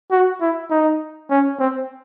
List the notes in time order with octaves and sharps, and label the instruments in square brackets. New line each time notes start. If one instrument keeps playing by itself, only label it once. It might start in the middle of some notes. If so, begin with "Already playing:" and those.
[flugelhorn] F#4
E4
D#4
C#4
C4